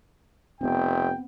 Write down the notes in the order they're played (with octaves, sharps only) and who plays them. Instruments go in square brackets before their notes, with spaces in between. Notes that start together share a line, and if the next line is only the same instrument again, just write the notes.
[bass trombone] F1 [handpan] B3 C4 [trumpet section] G5